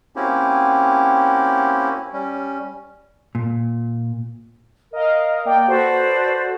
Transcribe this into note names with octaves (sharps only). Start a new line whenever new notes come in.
A#3 C4 C#4 E4 F#4 G4
G3 C#4
A#2
A#4 D#5 F5
A#3 D5 G5
F#4 A4 B4 C5 D5